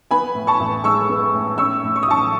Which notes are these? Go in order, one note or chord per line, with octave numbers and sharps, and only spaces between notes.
B3 G#5 B5
A2
A5 C#6
A1
G#3 C#6 E6
B3
A2
C#4 C#6 E6
A2
C#6
D#6
A1 A5 C#6